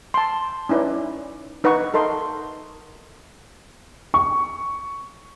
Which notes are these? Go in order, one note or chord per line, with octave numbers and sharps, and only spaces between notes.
A5 C6
C#4 D#4 E4 B4 D5
D#4 B4 D#5 F#5 C#6
A4 A#4 D#5 C6
C#6